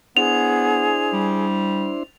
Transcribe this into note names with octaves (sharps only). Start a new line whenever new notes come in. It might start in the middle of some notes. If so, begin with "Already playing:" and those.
B3 D4 E4 G#4 C5 F7
G3